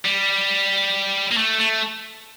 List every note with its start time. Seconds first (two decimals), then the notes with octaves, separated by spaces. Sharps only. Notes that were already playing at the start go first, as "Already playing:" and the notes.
0.05 G3
1.31 A#3
1.37 A3
1.60 A3